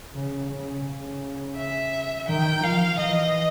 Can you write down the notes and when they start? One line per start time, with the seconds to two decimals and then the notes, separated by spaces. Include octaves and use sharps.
0.14 C#3
0.50 C#3
0.86 C#3
1.56 E5
2.28 D#3 G5
2.63 F3 F5
2.99 E3 D#5